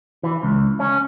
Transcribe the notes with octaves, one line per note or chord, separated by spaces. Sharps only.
E3
C#2
C#4